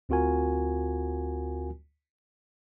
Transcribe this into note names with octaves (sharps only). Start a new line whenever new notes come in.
D2 C4 F4 F#4 A#4 G#5